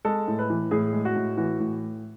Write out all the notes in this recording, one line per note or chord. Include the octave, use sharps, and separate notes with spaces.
G#3 A4
A2
B4
E3
A2 G#4
G#3
F#4
A2
E3 F#4
A2